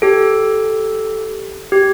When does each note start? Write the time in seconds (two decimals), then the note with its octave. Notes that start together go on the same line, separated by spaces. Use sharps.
0.02 G4 A4
1.72 G4